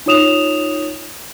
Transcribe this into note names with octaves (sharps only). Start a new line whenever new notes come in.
D#4 F4 C#5 D#6 E7 F7